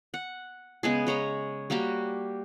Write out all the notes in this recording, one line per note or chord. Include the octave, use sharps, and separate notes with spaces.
F#5
C#3 G#3 B3 G#4
G#3 C#5 A#5 B5
G3 A#3 F#4 G4